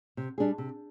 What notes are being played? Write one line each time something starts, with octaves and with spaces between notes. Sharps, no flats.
C3
G3 D4 G#4
C3